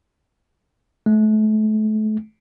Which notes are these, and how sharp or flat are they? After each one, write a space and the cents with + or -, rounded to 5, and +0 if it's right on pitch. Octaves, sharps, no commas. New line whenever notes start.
A3 -35